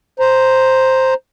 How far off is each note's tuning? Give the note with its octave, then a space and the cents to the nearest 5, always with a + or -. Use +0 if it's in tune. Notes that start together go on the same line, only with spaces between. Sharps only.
C5 +0 A#5 +0